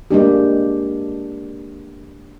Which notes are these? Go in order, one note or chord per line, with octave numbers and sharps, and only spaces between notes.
G#3 A#3 D4 G4